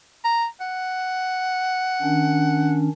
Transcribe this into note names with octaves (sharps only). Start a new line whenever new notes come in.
A#5
F#5
D#3 C#4 D4